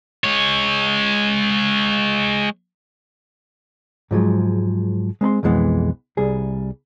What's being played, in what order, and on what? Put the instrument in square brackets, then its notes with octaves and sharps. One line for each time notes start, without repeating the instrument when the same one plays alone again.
[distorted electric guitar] G#3 C#5
[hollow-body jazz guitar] G#2 F3 F#3 G#3
G#3 C4 B5 C6
B1 F2 E3 G#3 B3
C2 G3 G#4